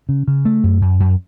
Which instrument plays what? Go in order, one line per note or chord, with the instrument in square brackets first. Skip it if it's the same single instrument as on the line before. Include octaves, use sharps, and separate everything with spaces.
[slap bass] C#3
C#3
A3
F#2
F#2
F#2